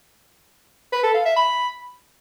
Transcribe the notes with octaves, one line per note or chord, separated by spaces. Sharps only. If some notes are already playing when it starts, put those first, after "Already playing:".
B4
A4
F5
E5
B5